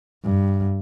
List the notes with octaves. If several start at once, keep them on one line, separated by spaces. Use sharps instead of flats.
G2